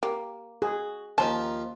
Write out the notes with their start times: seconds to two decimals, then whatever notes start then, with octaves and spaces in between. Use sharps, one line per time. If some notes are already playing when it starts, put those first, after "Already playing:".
0.03 A#3 G4
0.62 F#4 G#4
1.18 D#2 D#3 F3 A#3 C#4 F4 A5